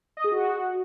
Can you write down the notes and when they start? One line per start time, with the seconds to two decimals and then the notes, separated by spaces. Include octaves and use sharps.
0.17 D#5
0.24 G#4
0.32 F#4